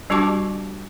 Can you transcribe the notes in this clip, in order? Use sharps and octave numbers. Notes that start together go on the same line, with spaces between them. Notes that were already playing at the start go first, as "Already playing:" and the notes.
G3 D4 F#4 G4 A5 D6